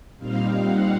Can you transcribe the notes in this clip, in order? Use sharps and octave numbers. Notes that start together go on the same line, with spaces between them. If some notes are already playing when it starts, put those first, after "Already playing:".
A#2 G3 C4 D#4 F5
F#5